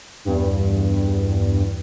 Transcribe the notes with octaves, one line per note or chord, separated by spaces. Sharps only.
E2 G2